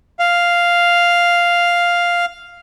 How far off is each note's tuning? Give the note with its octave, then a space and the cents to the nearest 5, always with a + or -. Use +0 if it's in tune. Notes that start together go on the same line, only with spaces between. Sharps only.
F5 +0